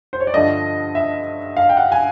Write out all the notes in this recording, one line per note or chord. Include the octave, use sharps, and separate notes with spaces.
C5
C#5
D5
G2 D3 F3 A3 D#5
E5
F5
G5
F#5
G#5